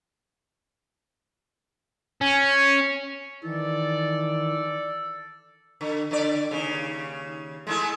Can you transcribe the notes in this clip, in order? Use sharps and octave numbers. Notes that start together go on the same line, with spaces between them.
C#4
D#3 E3 A4 D5
D3
D3 D5
D#2 C#3
G#3 A3 E4